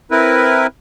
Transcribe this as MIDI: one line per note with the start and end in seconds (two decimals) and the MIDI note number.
0.11 0.67 60
0.11 0.67 64
0.11 0.67 70
0.11 0.67 71